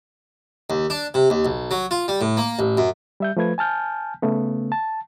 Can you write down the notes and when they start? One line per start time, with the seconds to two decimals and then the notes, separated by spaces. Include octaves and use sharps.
0.70 D#2
0.90 D4
1.14 C3
1.30 D#2
1.45 B1
1.71 F#3
1.91 F4
2.08 G3
2.21 A2
2.37 A#3
2.59 A1
2.77 F#2
3.20 G3 E5 G6
3.37 F3 A3 B4 G#6
3.58 G#5 A5 F6 G6
4.22 C#3 A3 B3
4.72 A5